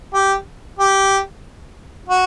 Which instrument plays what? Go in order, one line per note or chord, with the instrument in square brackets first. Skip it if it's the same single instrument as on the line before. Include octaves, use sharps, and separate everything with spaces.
[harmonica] G4
G4
F#4